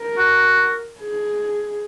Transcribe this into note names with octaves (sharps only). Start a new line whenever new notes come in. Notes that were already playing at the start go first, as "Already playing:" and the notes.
Already playing: A#4
F#4
G#4